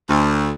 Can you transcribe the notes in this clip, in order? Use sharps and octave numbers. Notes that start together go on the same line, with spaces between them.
D2